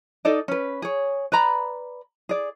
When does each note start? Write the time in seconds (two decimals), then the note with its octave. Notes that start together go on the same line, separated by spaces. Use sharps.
0.25 D#4 A4 D5 D#5
0.48 C#4 B4
0.82 G#4 C#5
1.32 B4 D5 A#5 B5
2.29 G#4 D5